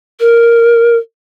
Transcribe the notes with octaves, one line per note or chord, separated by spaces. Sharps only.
A#4